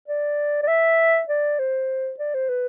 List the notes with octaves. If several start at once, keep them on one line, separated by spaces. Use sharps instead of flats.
D5
D5
E5
D5
C5
D5
C5
B4